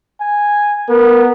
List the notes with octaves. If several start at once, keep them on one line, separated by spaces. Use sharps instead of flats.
G#5
B3 A#4